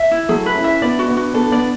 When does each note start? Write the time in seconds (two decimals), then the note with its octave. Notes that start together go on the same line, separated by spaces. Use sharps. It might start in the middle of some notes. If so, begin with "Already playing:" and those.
Already playing: E5
0.11 E4
0.28 F#3 A3 G#4
0.46 B4
0.55 C#4 E4
0.64 E5
0.81 B3 D4 D5
0.99 F#4
1.08 B3 D4
1.17 F#4
1.34 B3 D4 A4
1.52 B3 D4 D5